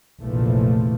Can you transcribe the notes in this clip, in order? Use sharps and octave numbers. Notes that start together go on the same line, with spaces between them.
F1 A#1 E3 F3 A3